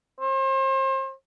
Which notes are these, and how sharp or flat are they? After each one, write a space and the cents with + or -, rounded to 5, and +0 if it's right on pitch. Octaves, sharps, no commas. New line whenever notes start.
C5 +35